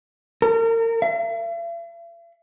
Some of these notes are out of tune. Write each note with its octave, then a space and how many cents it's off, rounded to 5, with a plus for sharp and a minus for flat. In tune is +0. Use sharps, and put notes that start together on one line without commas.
A#4 -35
E5 +45